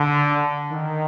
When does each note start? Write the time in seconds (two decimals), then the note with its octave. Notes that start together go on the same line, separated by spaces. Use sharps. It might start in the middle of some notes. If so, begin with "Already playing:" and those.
Already playing: D3
0.71 D#3